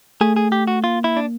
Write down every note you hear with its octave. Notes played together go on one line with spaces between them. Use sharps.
A3 G#4
G#4
G4
F#4
A#3 F4
E4
D4